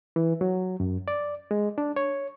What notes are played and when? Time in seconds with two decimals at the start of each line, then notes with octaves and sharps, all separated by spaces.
0.16 E3
0.41 F#3
0.80 F#2
1.08 D5
1.51 G#3
1.78 D4
1.96 C#5